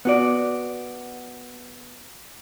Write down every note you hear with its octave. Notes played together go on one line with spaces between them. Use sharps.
B3 F#4 D5